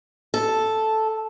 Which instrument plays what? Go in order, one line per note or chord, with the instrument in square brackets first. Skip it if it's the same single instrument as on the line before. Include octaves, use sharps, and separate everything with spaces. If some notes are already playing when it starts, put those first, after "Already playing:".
[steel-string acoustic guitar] A4